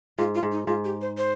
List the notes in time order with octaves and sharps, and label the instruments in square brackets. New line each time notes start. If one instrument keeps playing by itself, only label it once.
[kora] G#2 [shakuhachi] F4
[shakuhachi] F4
[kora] G#2
[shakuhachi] D#4
[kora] G#2 [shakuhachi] F4
[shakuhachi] G4
C5
C5